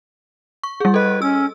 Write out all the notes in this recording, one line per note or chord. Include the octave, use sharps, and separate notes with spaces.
C#6
G3 G#4
A4 B4 D#5
C#4 E6